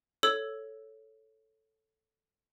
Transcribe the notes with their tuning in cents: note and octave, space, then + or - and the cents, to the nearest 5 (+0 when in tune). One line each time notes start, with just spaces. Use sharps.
A4 +0 C#5 +0 E6 +0